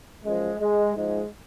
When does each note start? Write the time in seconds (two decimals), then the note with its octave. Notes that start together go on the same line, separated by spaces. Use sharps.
0.24 F#2 F3 G#3
0.60 G#3
0.96 G#2 F3 G#3